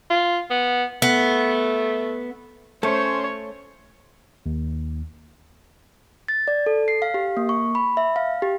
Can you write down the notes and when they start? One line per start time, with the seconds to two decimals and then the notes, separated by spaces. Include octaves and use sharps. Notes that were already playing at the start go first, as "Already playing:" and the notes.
0.10 F4
0.50 B3
1.02 A3 B3
2.83 A3 C#4 C5 C#5
4.46 D#2
6.28 A6
6.48 D5
6.66 A4
6.88 C7
7.02 F5
7.14 G4
7.37 A#3
7.49 C#6
7.75 B5
7.97 E5
8.16 F5
8.42 G4